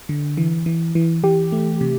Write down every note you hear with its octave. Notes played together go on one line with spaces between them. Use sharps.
D3
E3
E3
E3
E3 G4
A3
C3